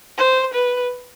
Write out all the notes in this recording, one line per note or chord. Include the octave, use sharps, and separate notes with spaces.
C5
B4